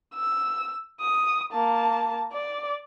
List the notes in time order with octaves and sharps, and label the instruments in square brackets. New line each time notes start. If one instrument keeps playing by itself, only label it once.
[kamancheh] E6
D#6
A#3 A5
D5